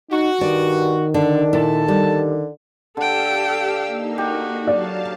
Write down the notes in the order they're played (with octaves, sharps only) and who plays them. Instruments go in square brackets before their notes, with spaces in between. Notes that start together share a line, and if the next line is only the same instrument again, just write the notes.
[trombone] D#4 [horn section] F#4
[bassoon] G2 [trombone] D#3 [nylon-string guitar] D5
[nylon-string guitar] D3 [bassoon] D4
[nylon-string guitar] A#2 E4 [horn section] A4 A5
[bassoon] D3 [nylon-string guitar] G3
[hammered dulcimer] D3 [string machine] G4 F5 E6 [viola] A4 G5
[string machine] A#3 D#4
[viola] F#4 [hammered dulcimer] G4
[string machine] F#3 F5 A5 [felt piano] D5